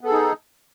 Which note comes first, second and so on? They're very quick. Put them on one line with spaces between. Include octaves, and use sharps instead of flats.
B3 A4 G#4 D#4